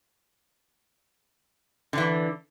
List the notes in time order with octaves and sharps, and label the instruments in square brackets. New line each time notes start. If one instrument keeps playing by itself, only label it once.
[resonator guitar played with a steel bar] D3 E3